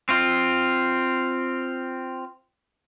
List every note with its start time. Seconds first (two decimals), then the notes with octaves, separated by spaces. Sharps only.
0.09 C4 F4